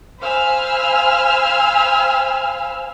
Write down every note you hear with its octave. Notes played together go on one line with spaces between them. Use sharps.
C5 F5 G#5 B5 E6 F6